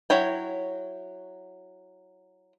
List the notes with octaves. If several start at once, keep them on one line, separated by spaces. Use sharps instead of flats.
F#3 E4 C#5 G5